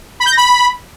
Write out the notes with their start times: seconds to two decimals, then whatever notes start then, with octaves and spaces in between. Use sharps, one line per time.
0.20 B5
0.26 G6
0.31 A#6
0.37 B5